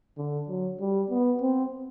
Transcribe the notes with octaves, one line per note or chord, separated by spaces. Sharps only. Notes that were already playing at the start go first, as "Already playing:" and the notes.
D3
F#3
G3
B3
C4